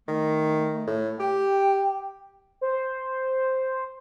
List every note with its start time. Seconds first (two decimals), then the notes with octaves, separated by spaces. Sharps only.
0.08 D#3 A3
0.87 A2
1.20 G4 G5
2.61 C5